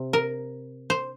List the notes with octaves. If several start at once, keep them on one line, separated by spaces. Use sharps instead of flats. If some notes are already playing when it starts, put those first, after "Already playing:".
Already playing: C3
A#4
C5